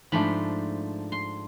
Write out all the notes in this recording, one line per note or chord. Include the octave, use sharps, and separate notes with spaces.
G#2 F3 A3 D4 B5
C6